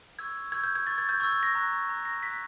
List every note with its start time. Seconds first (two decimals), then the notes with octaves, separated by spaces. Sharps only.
0.18 C#6 E6 G6 G#6
0.52 C#6 E6 G6 G#6
0.64 G6
0.75 G#6
0.87 C#6 E6 G6 A6
0.98 G#6
1.09 G6
1.20 C#6 E6 G6 G#6
1.32 G#6
1.43 A#6
1.55 A#5 C#6 F#6
1.89 A#5 C#6 F#6
2.05 A#6
2.23 A#5 C#6 F#6 B6